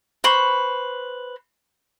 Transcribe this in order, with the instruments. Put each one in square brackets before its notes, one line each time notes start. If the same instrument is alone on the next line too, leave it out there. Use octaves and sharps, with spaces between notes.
[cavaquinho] B4 C5 B5 C#6